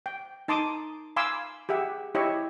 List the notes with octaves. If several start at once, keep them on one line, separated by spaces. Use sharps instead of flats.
G5
D#4 A5 C6 D6 D#6
F5 G#5 B5 C6 D6 E6
G4 G#4 E5 F#5
E4 G4 C#5 D#5 E5 C#6